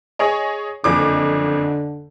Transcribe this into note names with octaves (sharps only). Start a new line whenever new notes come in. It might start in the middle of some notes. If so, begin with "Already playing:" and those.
G#4 C#5 D#5
F#1 F2 D3 D6